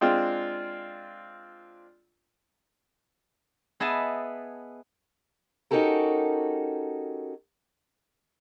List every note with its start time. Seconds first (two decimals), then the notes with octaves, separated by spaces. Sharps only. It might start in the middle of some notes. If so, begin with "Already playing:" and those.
0.01 G#3 C4 D4 F4
3.80 B3 G#4 D#5 E5 A5
5.71 C#4 D#4 F#4 G4 A4 A#4